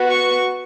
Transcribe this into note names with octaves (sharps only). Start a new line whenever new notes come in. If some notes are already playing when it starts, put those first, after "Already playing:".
Already playing: B3 F#4
C#6